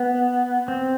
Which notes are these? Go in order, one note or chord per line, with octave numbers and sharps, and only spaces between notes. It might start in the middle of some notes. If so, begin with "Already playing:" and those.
Already playing: B3
C4